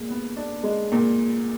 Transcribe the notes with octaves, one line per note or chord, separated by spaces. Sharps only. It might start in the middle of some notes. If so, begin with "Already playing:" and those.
Already playing: A#2 G#3
B3
D4
G#3
A#2